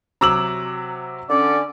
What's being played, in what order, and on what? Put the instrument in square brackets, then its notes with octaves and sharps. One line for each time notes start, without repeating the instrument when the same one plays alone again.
[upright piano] C3 F#3 D6 [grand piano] A#5 E6 F#7
[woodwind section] D3 C#4 [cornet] D5